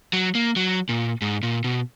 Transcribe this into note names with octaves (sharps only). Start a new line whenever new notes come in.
F#3
A#3
F#3
A#2
G#2
A#2
B2